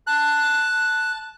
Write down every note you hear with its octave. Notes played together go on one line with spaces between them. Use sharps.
A5 F#6